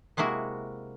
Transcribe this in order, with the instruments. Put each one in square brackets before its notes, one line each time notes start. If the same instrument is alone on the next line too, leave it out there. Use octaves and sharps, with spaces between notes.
[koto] C3 G#3 A#3 E4 F#4